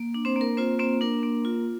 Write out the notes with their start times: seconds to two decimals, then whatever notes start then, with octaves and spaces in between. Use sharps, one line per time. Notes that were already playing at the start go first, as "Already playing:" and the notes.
Already playing: A#3
0.14 D4
0.25 C4 C5
0.36 A#3
0.41 A#4
0.57 C4 F4 C5
0.79 A#3 C4 C5
1.01 D4 A#4
1.23 A#3
1.45 F4